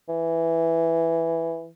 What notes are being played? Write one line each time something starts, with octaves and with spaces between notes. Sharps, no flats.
E3